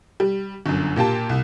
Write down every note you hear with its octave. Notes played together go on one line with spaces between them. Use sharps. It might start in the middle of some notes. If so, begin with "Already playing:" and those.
G3
G1 F#2
A#2 A#3 G4 A5
C2